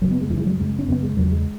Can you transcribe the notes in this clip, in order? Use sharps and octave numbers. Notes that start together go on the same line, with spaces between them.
F#2 C#3 F#3
B3
G#3
F#2 C#3 E3
G#3
F#3
F#2 C#3 G#3
C#4
F#2 C#3 B3
G#3
E2 C#3 F#3
G#3